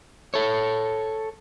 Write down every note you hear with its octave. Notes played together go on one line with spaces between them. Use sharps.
A4 C#5